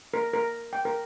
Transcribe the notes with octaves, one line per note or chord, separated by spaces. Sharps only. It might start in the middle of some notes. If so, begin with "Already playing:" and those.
A#4
A#4
G5
A#4